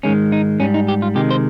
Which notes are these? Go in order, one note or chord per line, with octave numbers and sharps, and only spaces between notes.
G#2 D#3 G#3 C#4
D#4
G#2 G3 C#4
D#4
G4
F4
C3 D#3 G#3 G4
C5